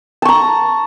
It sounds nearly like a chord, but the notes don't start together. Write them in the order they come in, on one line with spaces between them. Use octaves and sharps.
A5 C#6 A#5